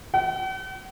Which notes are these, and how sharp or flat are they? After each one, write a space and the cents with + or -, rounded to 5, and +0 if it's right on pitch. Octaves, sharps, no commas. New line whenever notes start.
F#5 +45